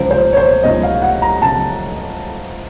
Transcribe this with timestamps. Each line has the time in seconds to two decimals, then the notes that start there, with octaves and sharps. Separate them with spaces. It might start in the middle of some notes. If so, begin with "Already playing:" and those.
Already playing: C#2 C#3 F3 C5
0.11 C5
0.33 C#5
0.37 C5
0.63 C#2 C#3 F3 D#5
0.83 F5
1.02 F#5
1.22 A#5
1.42 C#3 F3 A5